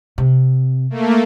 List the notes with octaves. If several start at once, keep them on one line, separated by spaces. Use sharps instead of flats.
C3
A3 A#3